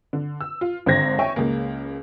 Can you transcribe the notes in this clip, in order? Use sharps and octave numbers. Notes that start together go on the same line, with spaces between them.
D3
E6
F4
G#1 D3 C4 C5 G#6 A#6
C#5 E5 G5 G#5 C#6
C#2 C#3 A#3